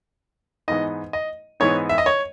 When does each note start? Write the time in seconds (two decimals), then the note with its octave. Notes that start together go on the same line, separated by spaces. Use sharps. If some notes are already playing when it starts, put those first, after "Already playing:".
0.68 G#2 E3 B3 D#4 D#5
1.13 D#5
1.60 G#2 E3 B3 D#4 C#5
1.89 E5
1.98 D#5
2.06 C#5